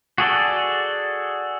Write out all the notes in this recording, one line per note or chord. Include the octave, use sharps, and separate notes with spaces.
F#4 G#4 A4 D5